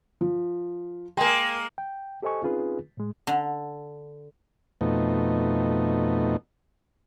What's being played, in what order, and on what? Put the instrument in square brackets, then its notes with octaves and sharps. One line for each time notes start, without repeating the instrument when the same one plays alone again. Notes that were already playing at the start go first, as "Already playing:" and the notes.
[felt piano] F3
[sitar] G#3 A#3 [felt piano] G5 C6
[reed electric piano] G5
G4 A4 C5 D#5 G#5 C#6
C4 C#4 D#4 F4 G#4 B4
A2 G#3
[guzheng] D3
[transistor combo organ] F2 B2 A3 D#4